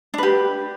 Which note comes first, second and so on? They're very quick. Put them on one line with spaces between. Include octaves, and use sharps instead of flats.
D4 B4 G4